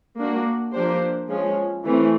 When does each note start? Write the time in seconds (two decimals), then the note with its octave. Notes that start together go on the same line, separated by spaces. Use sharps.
0.18 A#3 D4 F#4
0.73 F3 A#3 D4 G4 C5
1.28 F3 G#3 C#4
1.84 E3 A3 C4